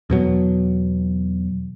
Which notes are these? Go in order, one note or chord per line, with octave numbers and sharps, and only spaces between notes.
E2 B2 F#3